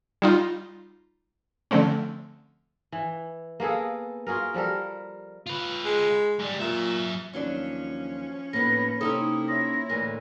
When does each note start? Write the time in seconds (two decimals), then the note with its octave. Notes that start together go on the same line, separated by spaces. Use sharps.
0.22 G3 D#4 F4
1.71 D3 F3 A3 C4 C#4
2.92 E3
3.60 A#3 B3 G#4 A4
4.27 F4 F#4 G#4 A#4
4.54 F3 G3 A4 A#4
5.46 F4 B4
5.85 G#3
6.39 G#2 G3
6.60 A#2 F#3 E5
7.33 D#2 F3 F#3 C#4 D4
8.53 A2 A#3 B3 D#4 A#6
9.01 C3 C#4 D#4 E4 A4 A#5 D#6
9.48 F4 C#5 E5 A#6
9.89 D2 A2 E3 A#4